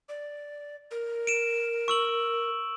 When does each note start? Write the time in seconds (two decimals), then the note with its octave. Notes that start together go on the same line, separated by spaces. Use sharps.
0.09 D5
0.91 A#4
1.27 D7 E7
1.88 C#6 E6 F#7